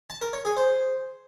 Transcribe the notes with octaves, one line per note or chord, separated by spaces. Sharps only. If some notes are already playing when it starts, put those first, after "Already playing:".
A5
A#4
C#5
G#4
C5